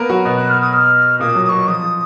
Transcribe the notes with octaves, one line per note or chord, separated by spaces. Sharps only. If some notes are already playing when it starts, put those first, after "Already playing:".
Already playing: A#3 B3 A#4 B4
F#3 F#4
B2 B3
F#6
F6
D#6
F6
A#2 A#3 D#6
F#3
D#6
F#3 C#6
F3 D#6
F3